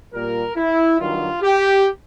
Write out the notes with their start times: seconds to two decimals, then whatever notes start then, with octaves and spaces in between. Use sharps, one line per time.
0.14 A#2 G3 A#4
0.56 E4
0.99 G2 D#3 F#3 F4
1.42 G4